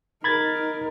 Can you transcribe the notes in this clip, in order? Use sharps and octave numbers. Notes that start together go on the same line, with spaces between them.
D#4 A#4 B5 G#6 A6